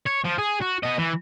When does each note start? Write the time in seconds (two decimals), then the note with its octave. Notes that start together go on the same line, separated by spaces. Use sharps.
0.07 C#5
0.25 F3
0.38 G#4
0.61 F#4
0.83 B3 D#5
0.98 E3